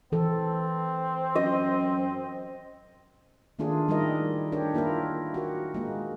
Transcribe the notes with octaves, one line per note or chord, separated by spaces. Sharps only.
E3 C4 A4
F#2 D#5
D#3 A3 A#3 D4 F4 G#4
G3 A3 D#4 E4 A#4 D#5
D4 G4 A#4 C#5
A#3 E4 F4 A#4
F#4 G4 A#4
G#3 A#3